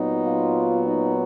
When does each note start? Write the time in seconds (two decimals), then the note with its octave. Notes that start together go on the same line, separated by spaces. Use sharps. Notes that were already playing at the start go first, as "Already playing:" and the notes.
Already playing: A#2 F#3 B3 D#4
0.25 F4
0.87 D#4